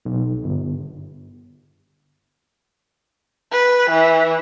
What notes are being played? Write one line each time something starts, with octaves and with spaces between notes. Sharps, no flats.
B1
G1
B4
E3